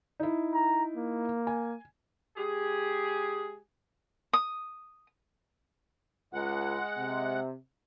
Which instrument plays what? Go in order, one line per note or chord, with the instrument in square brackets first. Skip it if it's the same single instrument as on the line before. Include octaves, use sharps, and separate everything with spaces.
[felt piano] D#4 E4
[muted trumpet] A#5
A#3
[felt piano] G#5
[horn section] G#3 G4 G#4
[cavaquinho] D#6
[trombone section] C#2 [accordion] G#3 F#5
[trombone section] C3